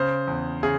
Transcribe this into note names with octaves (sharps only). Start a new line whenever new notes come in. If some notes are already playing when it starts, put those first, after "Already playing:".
Already playing: C#3 C5
E2
C#3 G#4